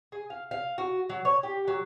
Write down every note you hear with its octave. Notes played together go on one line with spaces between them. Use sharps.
G#4
F5
F5
F#4
F#3
C#5
G4
F#3